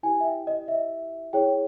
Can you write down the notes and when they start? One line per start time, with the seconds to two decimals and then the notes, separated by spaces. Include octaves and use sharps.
0.03 E4 G4 B4 G#5
0.21 E5
0.26 G5
0.47 D#5
0.68 E5
1.33 E4 G#4 C#5 G5